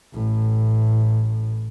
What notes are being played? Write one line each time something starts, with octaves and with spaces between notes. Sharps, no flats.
A1 A2